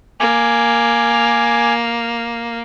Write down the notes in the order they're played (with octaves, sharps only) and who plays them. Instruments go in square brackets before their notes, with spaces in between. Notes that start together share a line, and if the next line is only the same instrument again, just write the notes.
[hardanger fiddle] A#3 [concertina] G#5 D6